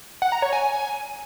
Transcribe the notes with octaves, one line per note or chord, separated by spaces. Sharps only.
F#5
A#5
C#5
G#5